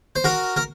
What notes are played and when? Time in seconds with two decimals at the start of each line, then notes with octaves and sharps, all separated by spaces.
0.16 C5
0.24 F#4 A#4
0.56 A#4